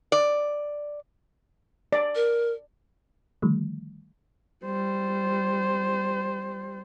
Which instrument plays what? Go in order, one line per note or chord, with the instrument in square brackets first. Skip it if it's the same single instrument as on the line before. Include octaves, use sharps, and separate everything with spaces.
[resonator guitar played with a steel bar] D5
[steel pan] D5
[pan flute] A#4
[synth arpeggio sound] D3 D#3 F3 G3 A3
[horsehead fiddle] G3 C5